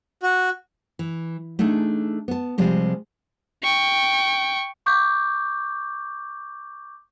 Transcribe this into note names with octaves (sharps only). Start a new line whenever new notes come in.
F#4
E3
A3 D4 D#4 G#4
B3 A5
C3 F3 G3 G#3 C4
G5 C#6
C#6 D6 G6